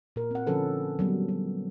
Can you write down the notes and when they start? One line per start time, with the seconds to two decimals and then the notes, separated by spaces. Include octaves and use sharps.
0.16 A#2 A#4
0.31 C4 F#5
0.47 D3 F3 C#4 A4 B4
0.99 F#3 G3 B3
1.29 F#3